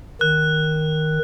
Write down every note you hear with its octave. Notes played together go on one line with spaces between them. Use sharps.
D#3 F#6